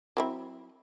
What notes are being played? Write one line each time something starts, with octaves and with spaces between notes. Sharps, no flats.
F#3 C4 E4